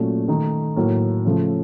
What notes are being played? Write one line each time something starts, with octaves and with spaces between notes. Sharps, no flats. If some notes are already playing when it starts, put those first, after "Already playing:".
Already playing: A#2 F#3 A3 C#4
D#3 A3 D#4
A2 F#3 A#3
C#3 F3 A3